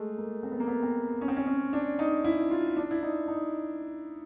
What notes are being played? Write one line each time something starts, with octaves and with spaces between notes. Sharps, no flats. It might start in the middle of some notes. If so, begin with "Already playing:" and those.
Already playing: G#3 A3
A#3
C4
B3
A#3
B3
C4
C#4
C4
C#4
C#4
D4
D#4
E4
F4
D4
E4
D#4
D#4